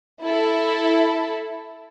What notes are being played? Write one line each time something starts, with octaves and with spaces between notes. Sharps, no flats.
E4 A4